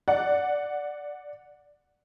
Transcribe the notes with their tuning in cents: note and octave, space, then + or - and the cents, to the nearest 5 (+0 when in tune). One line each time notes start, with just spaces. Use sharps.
D5 +0 F#5 -5